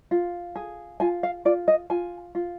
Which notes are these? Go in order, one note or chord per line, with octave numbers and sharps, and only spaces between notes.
F4
G#4
F4 G#5
F5
F4 D5
D#5
F4 G#5
F4